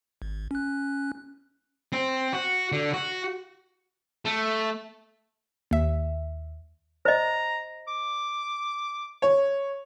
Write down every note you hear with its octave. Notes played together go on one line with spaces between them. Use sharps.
G#1
C#4 F#6
C4
F#4
D3
F#4
A3
D#2 E5
C5 D#5 A#5
D6
C#5